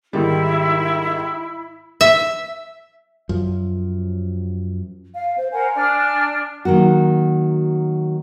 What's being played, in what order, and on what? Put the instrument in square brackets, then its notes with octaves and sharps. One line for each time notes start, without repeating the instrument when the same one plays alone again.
[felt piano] G#2 D#3 G3 [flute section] E4
[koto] E5
[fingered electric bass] F#2 F3
[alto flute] F5
C5
[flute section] A#4 C5 F#5 [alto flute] G#5
[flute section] D4 D5 F6
[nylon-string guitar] D#3 F#3 A#3 F#4